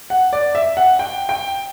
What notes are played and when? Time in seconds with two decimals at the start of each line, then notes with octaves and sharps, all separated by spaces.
0.10 F#5
0.33 D5
0.55 E5
0.77 F#5
0.99 G5
1.29 G5